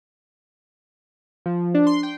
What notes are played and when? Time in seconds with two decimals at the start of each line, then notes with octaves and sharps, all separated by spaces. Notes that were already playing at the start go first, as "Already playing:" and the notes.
1.46 F3
1.75 D4
1.87 C6
2.03 G5